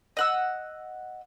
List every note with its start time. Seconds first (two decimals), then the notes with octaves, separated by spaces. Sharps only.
0.17 D#5 F#5 E6